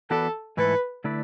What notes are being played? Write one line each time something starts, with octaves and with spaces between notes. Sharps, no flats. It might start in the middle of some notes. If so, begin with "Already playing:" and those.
E3 B3 F#4 A4 B4 D5
G#2 E3 A3 E4 A4 B4
D3 A3 E4 B4 D5